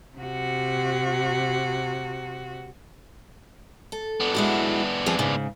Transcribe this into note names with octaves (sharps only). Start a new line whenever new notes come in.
C3 F#4
A4
B3 D4
G#3 E4 F#4
F3 C4 G#4
G#2 C#3